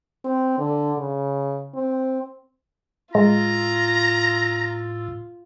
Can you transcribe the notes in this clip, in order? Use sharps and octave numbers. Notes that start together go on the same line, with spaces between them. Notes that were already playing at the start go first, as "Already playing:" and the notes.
C4
D3
C#3
C4
A2 G#3 F4 A#5